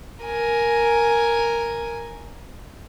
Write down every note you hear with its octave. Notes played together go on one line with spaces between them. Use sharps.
A#4 G#5